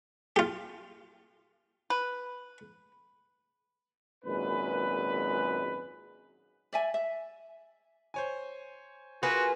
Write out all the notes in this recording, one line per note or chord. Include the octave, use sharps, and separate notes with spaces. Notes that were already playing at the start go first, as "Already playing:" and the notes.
F4 G4
B4
G#1 F#2 A#2 G#3 B4
D5 E5 G#5
E5
C5 C#5 G#5
A#3 F4 F#4 G#4 B4